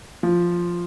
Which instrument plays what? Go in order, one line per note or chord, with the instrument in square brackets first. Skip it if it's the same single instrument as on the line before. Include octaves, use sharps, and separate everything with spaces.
[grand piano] F3